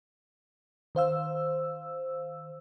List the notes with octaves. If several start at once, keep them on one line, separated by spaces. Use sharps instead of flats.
D#3 C5 F5 E6